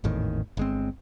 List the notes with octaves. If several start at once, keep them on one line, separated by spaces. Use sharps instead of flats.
G#1 E2 A2 D#3
G1 G#3 C4